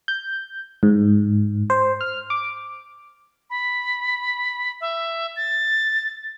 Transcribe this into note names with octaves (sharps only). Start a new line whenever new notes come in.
G6
G#2
C5
F6
D6
B5
E5
A6